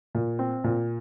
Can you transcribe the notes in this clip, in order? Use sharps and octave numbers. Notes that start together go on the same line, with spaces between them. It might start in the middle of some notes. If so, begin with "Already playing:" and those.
A#2
C4
A#2